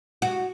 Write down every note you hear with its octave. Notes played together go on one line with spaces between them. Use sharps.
F#4